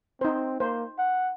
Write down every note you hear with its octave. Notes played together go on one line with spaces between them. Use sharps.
C4 D#4 C5
A#3 C5
F#5